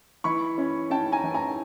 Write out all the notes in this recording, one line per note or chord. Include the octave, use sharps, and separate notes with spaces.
E3 B5 C#6
C#4
C#4 G5 A5
G#5 A#5
E3
G#5 A#5